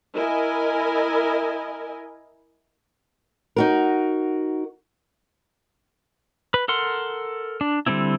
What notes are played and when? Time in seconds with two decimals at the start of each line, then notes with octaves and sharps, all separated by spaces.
0.15 E4 A#4 D#5 G#5
3.56 D#4 F#4 A#4
6.54 B4
6.68 A4 A#4 F#5 C6
7.61 D4
7.86 D3 G3 A#3 C4 E4